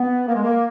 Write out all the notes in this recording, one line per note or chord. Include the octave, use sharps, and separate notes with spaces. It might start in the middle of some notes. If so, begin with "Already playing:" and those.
Already playing: B3
A#3
G#3
A#3